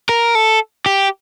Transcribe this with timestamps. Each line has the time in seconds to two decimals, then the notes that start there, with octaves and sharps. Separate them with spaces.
0.09 A#4
0.35 A4
0.86 G4